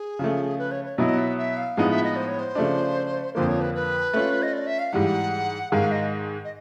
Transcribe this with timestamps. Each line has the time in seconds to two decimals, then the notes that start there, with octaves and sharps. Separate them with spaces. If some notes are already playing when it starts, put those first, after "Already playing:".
Already playing: G#4
0.19 C#3 F3 A3
0.58 B4
0.71 C#5
0.85 C#5
0.98 B2 F#3 B3 E4 D#5
1.18 E5
1.38 E5
1.57 F5
1.77 A2 F3 G#3 B3 D#4 F#5
1.90 E5
2.03 D#5
2.16 C5
2.28 C#5
2.39 C5
2.55 C#3 F3 A3 D4
3.35 F2 D3 F3 A#3 C5
3.48 C#5
3.61 B4
3.75 B4
4.13 A3 C#4 F4
4.43 D#5
4.53 D5
4.67 E5
4.79 F5
4.93 G#2 E3 G3 F#5
5.72 G#2 D#3 G#3 F5
5.91 D#5
6.44 D#5